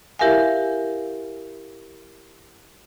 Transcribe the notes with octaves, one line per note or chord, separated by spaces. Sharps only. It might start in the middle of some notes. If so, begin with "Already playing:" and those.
E4 G4 A#4 E5 F5 G#5